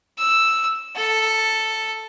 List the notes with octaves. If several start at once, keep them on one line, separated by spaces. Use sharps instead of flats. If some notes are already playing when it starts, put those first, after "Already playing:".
E6
A4